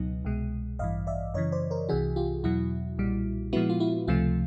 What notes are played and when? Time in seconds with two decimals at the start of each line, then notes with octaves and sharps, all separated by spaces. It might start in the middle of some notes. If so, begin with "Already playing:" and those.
Already playing: C#2 B2 F#3 B3 D#4
0.25 C2 B2 G#3
0.79 A1 G2 E3 D#5 F5
1.07 D5 E5
1.34 F#2 C#3 E3 C#5 D#5
1.52 C5 D5
1.71 A#4 C5
1.89 C2 C3 E3 F#4 G#4
2.16 F4 G4
2.44 E2 B2 F#3 E4 F#4
2.98 B1 A#2 G3
3.53 A#2 F3 G#3 B3 E4 F#4
3.70 F4
3.80 E4 F#4
4.08 C#2 C3 F3 A3 F4